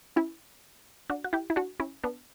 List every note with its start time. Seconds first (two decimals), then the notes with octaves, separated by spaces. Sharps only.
0.16 C#4 E4
1.10 D4 F#4
1.24 F#4
1.33 E4 G4
1.50 E4
1.56 D4 F#4
1.80 C#4 E4
2.04 B3 D4